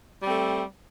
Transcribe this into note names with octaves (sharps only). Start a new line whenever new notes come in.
G3 A3 C4